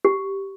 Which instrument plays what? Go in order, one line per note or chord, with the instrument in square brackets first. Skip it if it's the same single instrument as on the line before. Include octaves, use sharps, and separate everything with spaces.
[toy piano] G4